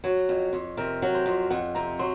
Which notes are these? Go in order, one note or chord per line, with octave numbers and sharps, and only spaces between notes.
F#3 C#5
F2
F2
C3 A#4
F#3
C5
F2
F2 F#5
C3 A#5
F#3 C6